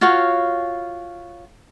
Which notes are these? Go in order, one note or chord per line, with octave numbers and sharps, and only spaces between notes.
F4 F#4 C#5 F5